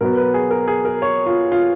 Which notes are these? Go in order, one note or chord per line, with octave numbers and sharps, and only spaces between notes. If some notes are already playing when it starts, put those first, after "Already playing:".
B2 F#3 B3 A#4
B4
G#4
A#4
G#4
A#4
C#5
F4
F4